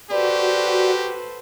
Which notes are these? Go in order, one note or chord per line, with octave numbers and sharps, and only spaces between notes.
F#4 G4 A4 B4 C5 D5